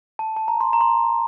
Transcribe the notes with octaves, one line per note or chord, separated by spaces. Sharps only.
A5
A5
A#5
C6
A#5
C6